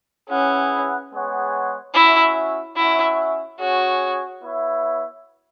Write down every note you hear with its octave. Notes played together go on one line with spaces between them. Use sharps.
C#4 E4 G#4 B4 F#5
G#3 B3 G#4 C#5 F#5
C#4 E4 F#4 E5
C#4 E4 F#4 E5
C#4 F#4 G#4 C#5
B3 E4 C#5 E5